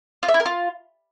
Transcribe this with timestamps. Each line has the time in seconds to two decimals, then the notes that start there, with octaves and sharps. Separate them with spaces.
0.23 F4
0.28 E5
0.34 E4
0.40 A#4
0.46 F4